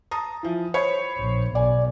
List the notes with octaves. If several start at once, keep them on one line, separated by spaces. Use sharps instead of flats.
A5 A#5 D#6
E3 F3
C5 C#5 B5
A#1
B1 D5 G#5